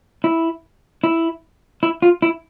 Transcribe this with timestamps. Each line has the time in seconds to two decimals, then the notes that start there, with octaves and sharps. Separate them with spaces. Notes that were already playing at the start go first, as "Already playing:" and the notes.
0.24 E4
1.04 E4
1.83 E4
2.02 F4
2.22 E4